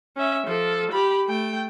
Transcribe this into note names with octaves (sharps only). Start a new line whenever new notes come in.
C#4 E5
F3 A4
G4 B5
A3 G5